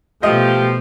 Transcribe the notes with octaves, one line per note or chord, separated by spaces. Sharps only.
B2 F3 A3 G4 D#5